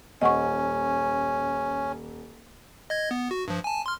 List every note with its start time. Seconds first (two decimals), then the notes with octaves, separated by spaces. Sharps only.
0.21 D#1 C#4 D#5 F#5 C#6
2.90 D#5 G#6
3.11 B3
3.31 F#4
3.48 G2 F3
3.64 G#5 A5
3.86 C6 F6